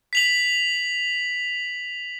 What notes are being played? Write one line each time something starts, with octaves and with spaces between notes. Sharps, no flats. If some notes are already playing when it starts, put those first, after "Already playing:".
B6 F7 F#7